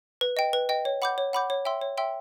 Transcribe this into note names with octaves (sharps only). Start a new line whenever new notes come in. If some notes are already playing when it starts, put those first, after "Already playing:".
B4
D#5 G5
B4
D#5 G5
C#5
F#5 B5 D6 G6
C#5
F#5 B5 D6 G6
C#5
E5 G5 C6 E6
C#5
E5 G5 C6 E6